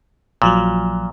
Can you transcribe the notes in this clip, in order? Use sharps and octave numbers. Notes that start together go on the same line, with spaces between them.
A#1 A#2 F3 F#3